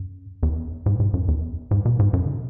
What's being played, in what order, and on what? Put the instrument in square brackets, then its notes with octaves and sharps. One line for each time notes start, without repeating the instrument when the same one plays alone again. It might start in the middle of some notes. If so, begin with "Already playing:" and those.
Already playing: [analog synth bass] F#2
E2
G#2
B2
G#2
F#2
E2
G#2
B2
G#2
F#2
C#3
B2